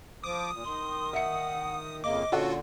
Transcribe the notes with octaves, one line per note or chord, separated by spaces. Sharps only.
F3 D6 D#6
A#2
D#3 C6
E5 F#5 C#7
F2 C#3 A#3 D#5 D6
A#2 D3 C#4 F4 F#4 A4 F#5